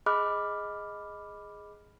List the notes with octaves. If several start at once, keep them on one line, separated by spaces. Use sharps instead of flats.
G#4 D#5 B5 D6 F6 F#6